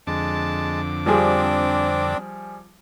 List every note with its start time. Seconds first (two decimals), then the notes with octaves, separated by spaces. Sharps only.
0.07 F2 D3 G#3 A5 D6
1.06 F3 G3 C4 D4 G#4